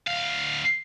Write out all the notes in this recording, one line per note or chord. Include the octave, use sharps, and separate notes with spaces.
D2 F5